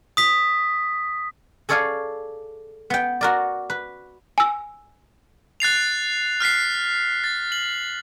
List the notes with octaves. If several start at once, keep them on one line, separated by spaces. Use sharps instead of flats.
D#6 B6
G#4 A4 C#5 D5 F5 G#5
B3 G5
F#4 A#4 D5
B4
G#5 E6
F#6 A6 C7 F7
F6 F#6 B6 C7
A6
F#7